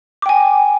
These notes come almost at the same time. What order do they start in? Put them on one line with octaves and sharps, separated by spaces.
D6 G5 G#5